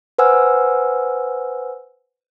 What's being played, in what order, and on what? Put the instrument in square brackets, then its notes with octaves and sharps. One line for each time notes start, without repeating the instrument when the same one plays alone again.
[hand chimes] B4 C5 F#5 G#5 E6 F6